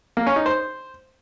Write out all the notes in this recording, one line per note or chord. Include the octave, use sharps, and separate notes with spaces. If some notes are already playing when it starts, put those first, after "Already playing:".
A#3
C#4
D#4
C5